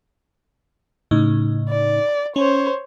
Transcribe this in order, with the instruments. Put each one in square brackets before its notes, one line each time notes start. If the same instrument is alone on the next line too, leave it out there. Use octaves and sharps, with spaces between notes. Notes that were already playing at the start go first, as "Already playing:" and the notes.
[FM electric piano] A2 C#3 D#4
[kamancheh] D5
[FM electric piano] C#4 [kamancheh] C5 C#5